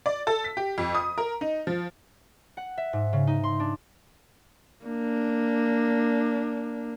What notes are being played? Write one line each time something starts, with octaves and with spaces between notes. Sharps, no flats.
D5
A4
B6
G4
F2
D#6
A#4
D#4
F3
F#5
E5
G#2
C#3
D#4
C6
D4
A#3 D4